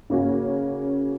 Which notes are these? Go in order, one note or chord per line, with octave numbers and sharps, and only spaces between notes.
C#3 A#3 C#4 F#4